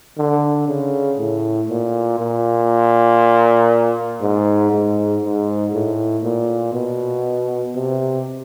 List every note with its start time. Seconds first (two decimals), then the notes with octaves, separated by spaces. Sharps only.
0.18 D3
0.68 C#3
1.18 A2
1.69 A#2
2.19 A#2
4.22 G#2
4.72 G#2
5.22 G#2
5.73 A2
6.23 A#2
6.73 B2
7.75 C3